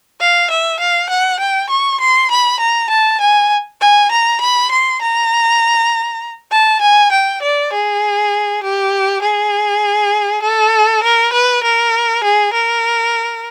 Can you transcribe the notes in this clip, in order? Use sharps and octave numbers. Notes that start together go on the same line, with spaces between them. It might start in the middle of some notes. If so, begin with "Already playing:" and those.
F5
E5
F5
F#5
G5
C#6
C6
B5
A#5
A5
G#5
G#5
A#5
B5
C6
A#5
A5
G#5
G5
D5
G#4
G4
G#4
A4
A#4
B4
A#4
G#4
A#4